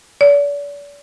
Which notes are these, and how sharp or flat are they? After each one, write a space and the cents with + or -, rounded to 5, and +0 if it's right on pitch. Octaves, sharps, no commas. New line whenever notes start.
D5 -40